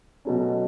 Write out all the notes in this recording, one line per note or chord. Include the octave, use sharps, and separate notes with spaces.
B2 F#3 A3 C#4